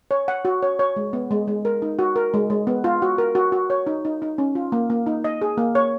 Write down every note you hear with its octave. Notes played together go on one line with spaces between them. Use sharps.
C#5
F#5
F#4
C#5
C#5
G#3
B3
G#3
G#3
A#4
D#4
F#4
A#4
G#3
G#3
B3
F4
F#4
A#4
F#4
F#4
C#5
D#4
D#4
D#4
C#4
F4
A#3
A#3
D#4
D#5
G#4
A#3
C#5